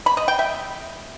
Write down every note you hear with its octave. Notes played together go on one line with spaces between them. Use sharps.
B5
D#5
G5
E5